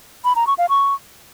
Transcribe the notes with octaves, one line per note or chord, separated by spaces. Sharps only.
B5
A#5
C#6
F5
C#6